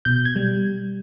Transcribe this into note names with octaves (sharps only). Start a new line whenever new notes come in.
B2 G6
G#6
G3